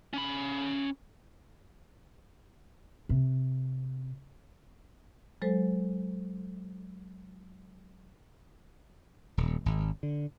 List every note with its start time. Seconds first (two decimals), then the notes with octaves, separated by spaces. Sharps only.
0.13 C#4 B5
3.09 C3
5.42 F#3 G#3 A4 C5
9.37 D#1
9.66 G#1
10.03 D3